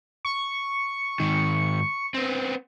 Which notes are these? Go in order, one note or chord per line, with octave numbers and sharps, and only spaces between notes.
C#6
G#2 D#3
B3 C4